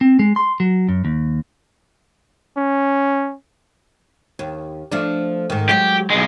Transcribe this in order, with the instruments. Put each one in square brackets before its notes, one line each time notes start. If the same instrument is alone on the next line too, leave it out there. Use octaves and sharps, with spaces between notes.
[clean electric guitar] C4
G#3
C6
F#3
F#2
D#2
[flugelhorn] C#4
[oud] D#2
F3 A3 D4
G#2 D#3
[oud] F#3 G#3 [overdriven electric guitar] G4
[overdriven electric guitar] B1 G#3